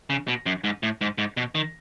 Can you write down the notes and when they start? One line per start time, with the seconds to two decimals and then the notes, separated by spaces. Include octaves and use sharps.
0.10 C#3
0.28 B2
0.46 F#2
0.64 G#2
0.83 A2
1.01 G#2
1.18 G#2
1.37 B2
1.55 D#3